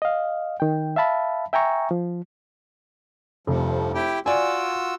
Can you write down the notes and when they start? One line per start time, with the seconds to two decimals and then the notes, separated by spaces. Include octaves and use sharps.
0.02 D#5 F5
0.60 D#3 G5
0.96 E5 F5 A5 B5
1.53 E5 G5 G#5 A#5 C#6
1.91 F3
3.47 F1 G2 C3 F3
3.95 E4 G4 G5
4.26 F4 F#4 D5 G#5 E6